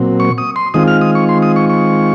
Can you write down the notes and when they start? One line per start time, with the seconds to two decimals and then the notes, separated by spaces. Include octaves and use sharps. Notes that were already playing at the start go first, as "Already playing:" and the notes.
Already playing: A#2 F#3 C4
0.20 C#6
0.38 D#6
0.56 C6
0.74 D#3 G#3 C4 F4 D#6
0.88 F6
1.01 D#6
1.15 C#6
1.29 C6
1.42 D#6
1.56 C#6
1.70 C#6